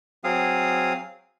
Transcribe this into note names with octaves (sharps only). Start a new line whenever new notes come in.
F#3 C4 G#4 F5 D#6